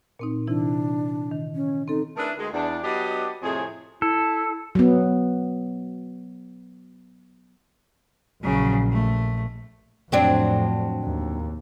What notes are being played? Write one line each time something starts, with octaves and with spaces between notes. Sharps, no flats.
A#2 C4 D#4
C3 E3 D4 E4
D#3
C#4
C4 D#4 A4
A3 D4 E4 G#4 A#4 B4
D2 G#3 G#4
E2 D4
F#3 B3 D4 G4 D#5
F2 A2 C3 C4 G#4
E4 A4
F#3 B3
A#1 C#3 F#3
A3
F2 A2 F#3 C4 D4
D#2